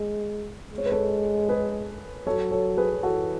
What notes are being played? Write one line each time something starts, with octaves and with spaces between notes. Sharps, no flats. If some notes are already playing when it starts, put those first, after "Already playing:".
Already playing: G#3
G#3
C#5
B4
A4 C#5
G#4 B4
F#3 A4 C#5
A4 C#5
G#4 B4
E3 F#4 A4